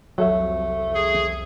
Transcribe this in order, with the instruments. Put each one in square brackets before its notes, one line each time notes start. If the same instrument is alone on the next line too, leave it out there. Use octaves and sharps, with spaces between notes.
[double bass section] C2 F2 [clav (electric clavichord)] F#3 A4 E5 [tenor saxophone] A3
[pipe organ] G#4